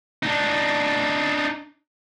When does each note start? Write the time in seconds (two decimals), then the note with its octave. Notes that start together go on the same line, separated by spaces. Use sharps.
0.23 D4 D#4